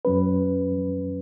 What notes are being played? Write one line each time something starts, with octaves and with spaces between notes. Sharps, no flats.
F#2 F#3 C#4 B4